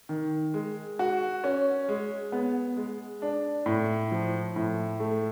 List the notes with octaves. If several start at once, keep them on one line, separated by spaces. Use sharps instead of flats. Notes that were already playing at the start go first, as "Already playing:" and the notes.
D#3
G#3
F#4
C#4
G#3
B3
G#3
D4
A2
F3
A2
A3